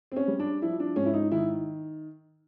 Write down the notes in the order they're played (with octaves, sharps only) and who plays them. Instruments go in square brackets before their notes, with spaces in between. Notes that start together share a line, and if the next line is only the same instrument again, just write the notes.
[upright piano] C4
C#4
G3
D4
F3 E4
D4
G#2 C#4
E4
D#4
D#3 E4